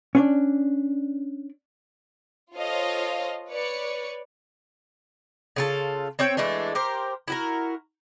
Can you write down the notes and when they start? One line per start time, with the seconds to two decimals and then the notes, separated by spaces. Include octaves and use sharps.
0.15 C#4 D4 D5
2.55 F4 A4 C5 C#5 D#5 F5
3.50 B4 C#5 D5 C#7
5.56 C#3 F4 A4
6.19 C4 C#5 E5 G5
6.37 E3 G#3 A3 D4
6.75 G4 A#4 C5
7.28 E4 F#4 A#4